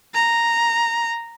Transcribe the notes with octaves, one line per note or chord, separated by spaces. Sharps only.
A#5